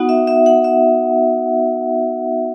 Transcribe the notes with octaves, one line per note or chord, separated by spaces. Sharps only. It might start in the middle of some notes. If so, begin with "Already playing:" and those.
Already playing: B3 D#4 F#4 F#5
E5
E5
F#5
E5